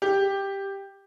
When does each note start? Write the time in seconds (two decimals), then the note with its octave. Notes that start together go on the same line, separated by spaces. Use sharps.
0.02 G4